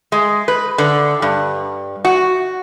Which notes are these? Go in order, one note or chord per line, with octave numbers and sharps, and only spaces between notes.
G#3
B4
D3
G2
F#4